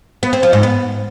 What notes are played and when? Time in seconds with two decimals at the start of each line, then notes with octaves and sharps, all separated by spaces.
0.23 B3
0.33 C4
0.43 F3
0.53 G#2
0.63 B3